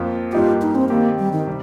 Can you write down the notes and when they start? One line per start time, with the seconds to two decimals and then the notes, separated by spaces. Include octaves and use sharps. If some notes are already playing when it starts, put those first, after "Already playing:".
Already playing: F2 F3 A#3 F4
0.33 G2 G3 A#3 D#4 F4 G4
0.62 D#4
0.75 C4
0.89 D#3 A#3 C4 G4
1.19 G3
1.33 D#3
1.47 C3 G3